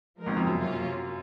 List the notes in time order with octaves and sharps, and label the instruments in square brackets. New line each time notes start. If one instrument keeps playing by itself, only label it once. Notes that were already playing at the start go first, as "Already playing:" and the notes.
[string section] F3 G#3 D#4 A#4
[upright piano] G#1 G#2
F2
F#2
[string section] C3 F#3 A#3 C#4 F4